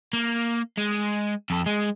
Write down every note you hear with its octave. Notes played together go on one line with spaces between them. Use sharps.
A#3
G#3
F2 A4
G#3